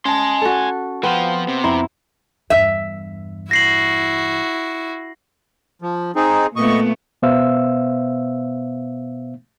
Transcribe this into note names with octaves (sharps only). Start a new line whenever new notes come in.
C#4 G#5 A5 C6
F#4 A4
F3 B3 C4 F4
C3
F2 E4 A#5 C6
E2 G2 E5
E4 F#4 A#6 C7 F#7
F3
C4 D#4 G#4
A#2 A3 B3 D#5 C#6
B2 B3 C5 E5 F5 E6